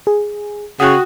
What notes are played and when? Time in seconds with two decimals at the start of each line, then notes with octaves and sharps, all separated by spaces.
0.07 G#4
0.80 C#3 F#4 F#5 G5 C#6 D#6 F#6